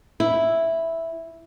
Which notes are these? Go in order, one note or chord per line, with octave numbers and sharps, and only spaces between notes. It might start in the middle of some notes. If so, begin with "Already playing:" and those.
E4